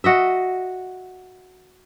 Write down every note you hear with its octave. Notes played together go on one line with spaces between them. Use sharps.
F#4 D#5 E5